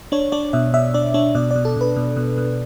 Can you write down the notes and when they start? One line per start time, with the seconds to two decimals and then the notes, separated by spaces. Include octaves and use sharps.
0.12 D4 C#5
0.32 D4 D5
0.53 B2 E5
0.74 B2 E5
0.94 D4 D5
1.14 D4 C#5
1.35 B2 D5
1.51 D5
1.56 B2
1.65 A4
1.76 B2 B4
1.96 B2
2.16 B2
2.38 B2